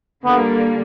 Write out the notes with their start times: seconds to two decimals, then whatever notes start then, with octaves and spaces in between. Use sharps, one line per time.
0.25 D3 G3 A#3 B3